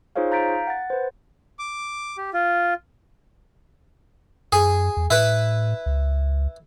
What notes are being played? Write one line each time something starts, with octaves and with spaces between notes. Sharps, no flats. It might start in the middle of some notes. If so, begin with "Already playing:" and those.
D#4 F4 G#4 C5 C#5 F5
F5 A#5 G6 A6 B6 D7
F#5 A6
B4 C5
D6
G4
F4
F#2 G#4
E2
A2 E4 B4
C#2